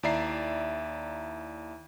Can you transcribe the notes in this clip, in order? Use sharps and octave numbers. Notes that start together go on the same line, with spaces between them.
D#2 E4 D5 E5 A#5 C7